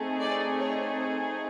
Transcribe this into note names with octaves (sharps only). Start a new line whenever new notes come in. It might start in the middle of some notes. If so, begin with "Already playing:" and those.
Already playing: A3 C4 D#4 G#4
D5
C#5